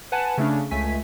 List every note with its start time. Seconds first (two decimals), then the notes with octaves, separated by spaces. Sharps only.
0.12 B4 F#5 G#5 A5
0.38 C#3 A3 C#4 D4
0.71 C#2 A3 G#5 B6